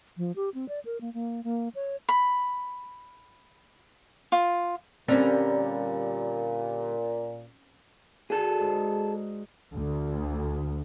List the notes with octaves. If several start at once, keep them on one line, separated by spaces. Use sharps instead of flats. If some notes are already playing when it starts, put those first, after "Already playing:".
F3
G4
C4
D5
A#4
A#3
A#3
A#3
C#5
B5
F4
A#2 D3 G3 C4 C#4 A#5
D3 F#4 G#4 A4
G#2
D2